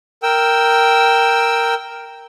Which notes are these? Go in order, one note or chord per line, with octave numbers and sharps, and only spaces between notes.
A#4 G5 E6